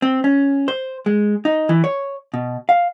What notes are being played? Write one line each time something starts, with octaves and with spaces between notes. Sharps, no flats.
C4
C#4
C5
G#3
D#4
E3
C#5
B2
F5